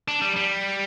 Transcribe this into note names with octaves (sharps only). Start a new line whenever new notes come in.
D4
G3
G3